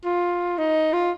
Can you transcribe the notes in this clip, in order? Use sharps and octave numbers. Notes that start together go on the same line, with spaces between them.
F4
D#4
F4